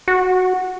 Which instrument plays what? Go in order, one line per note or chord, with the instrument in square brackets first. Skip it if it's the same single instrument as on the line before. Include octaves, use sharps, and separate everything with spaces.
[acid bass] F#4